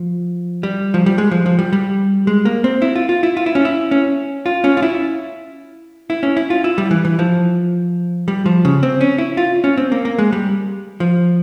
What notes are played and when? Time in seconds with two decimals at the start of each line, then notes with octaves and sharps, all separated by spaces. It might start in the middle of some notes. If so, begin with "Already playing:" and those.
Already playing: F3
0.63 G3
0.94 F3
1.06 G3
1.18 G#3
1.31 F3
1.46 F3
1.59 G3
1.73 G3
2.27 G#3
2.45 A#3
2.64 C4
2.82 E4
2.96 F4
3.09 F4
3.23 E4
3.37 F4
3.46 E4
3.55 C#4
3.65 E4
3.91 C#4
4.46 F4
4.64 C#4
4.77 F4
4.82 E4
6.10 E4
6.23 C#4
6.37 E4
6.50 F4
6.64 E4
6.78 G3
6.91 E3
7.05 E3
7.19 F3
8.28 G3
8.46 F3
8.65 C#3
8.83 C4
9.01 C#4
9.18 E4
9.37 F4
9.64 C#4
9.77 C4
9.92 A#3
10.05 A#3
10.18 G#3
10.33 G3
11.00 F3